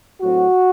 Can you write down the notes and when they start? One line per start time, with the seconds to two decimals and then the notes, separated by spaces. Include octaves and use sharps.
0.22 A2 F#3 C4 F#4